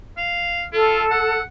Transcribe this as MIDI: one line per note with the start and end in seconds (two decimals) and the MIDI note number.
0.17 0.64 77
0.73 1.04 65
0.73 1.41 69
1.11 1.43 78